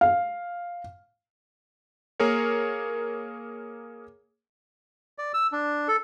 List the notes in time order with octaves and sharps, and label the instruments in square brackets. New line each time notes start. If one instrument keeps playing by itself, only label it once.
[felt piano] F5
[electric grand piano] A#3 G#4 A#4 C#5
[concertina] D5
E6
D4
A4